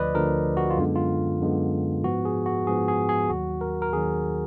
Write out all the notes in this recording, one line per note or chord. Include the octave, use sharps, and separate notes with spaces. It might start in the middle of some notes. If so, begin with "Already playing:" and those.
Already playing: D2 D3 F3 B4 D5 D#5
D2 D3 F3 A#4
F#4
F4
F#2 D3 G#3 B3
F4
F#2 D3 G#3 B3
G#2 F3 B3 F#4
G#4
F#4
G#2 F3 B3 G#4
G#4
G#4
D#2 D#3 F#3 F#4
A#4
A#4
D#2 D#3 F#3 G#4